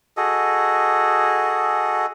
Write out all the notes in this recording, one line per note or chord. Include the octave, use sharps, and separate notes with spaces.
F#4 G#4 A4 D#5